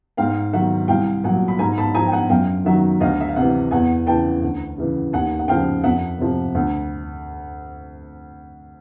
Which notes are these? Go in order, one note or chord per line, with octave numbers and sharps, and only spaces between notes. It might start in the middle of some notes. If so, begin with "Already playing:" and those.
G#2 F5 G5
D#3 F#3 E5 F#5
C2 F5 G5
A#2 F#3 F#5 G#5
B5
G#2 G#5 A#5
A5 B5
F3 G#5 A#5
G5
F#5 G#5
F#2 F5 G5
D#3 F#3 E5 F#5
D2 D#5 F5
E5
F5
C3 E3 E5 F#5
E2 F#5 G#5
C#3 E3 G5 A5
D2
C#3 E3
D#2 F#5 G#5
F#5
C#3 F3 F5 G5
F2 E5 F#5
C3 F3
D2